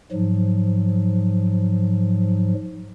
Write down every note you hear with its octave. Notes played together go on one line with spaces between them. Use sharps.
G#2 F3 F#3